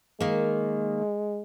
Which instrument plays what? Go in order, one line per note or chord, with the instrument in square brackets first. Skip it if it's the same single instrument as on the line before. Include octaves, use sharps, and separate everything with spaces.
[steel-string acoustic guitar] D#3 A#3 [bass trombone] G#3